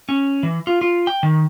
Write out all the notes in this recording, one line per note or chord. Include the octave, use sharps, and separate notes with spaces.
C#4
E3
F4
F4
G5
D#3